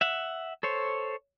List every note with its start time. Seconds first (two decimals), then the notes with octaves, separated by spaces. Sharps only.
0.01 E5 F#5
0.63 A4 C5 C#5